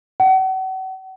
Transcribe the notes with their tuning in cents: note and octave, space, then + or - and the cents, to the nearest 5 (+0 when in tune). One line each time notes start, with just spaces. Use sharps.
F#5 +40